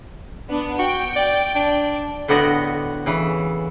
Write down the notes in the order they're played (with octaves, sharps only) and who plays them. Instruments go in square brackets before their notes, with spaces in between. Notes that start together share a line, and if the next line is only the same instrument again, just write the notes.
[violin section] B3 D4
[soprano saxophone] F#4 [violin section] G5
[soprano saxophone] D5
D4
[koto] A2 D3 B3 F#4 D#5
C#3 E3